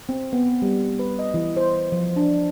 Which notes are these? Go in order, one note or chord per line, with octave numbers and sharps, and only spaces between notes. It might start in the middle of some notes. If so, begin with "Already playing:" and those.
C4
B3
G3
B4
D#5
E3
C5
F3
D4